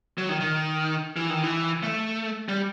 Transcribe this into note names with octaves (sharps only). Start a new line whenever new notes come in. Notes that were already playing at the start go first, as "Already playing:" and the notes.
F#3
D#3
D#3
E3
D#3
E3
A3
G3